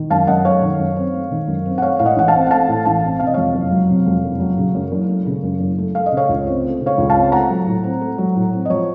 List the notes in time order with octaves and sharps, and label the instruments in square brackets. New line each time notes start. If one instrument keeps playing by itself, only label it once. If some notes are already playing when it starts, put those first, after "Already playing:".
Already playing: [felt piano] D#3
F#2 F5 A5
F#2 D#5 F#5
A3 C#5 F5
D#3
F#2
C4
A3
D#3
F#2
C4
F#5
A3 C#5 F5
A2 F5
D#5 F#5
A1 F#5
F5 A5
C4
F#5
A3 F5 A5
A2
A1 F5 A5
C4
C3 F5
D#5
F2 C#5 F5
F#1
F#3
C3
F2
F#1
F#3
C#3
F#2
F#1
A3
C#3
F#2
F#1
A3
A3 F5
D#5
C#3
C#5 F5
C#2
C4
A3
C#3
C#5 F5
C#2
F5 A5
C4
A3 F#5 A#5
F#3
A2
C4
A3
F#3
A2
C4
D#5
F3 C#5